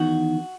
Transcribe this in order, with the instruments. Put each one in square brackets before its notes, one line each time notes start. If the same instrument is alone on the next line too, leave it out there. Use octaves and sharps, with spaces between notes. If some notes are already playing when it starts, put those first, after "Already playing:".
Already playing: [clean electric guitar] E2 D#3 F#4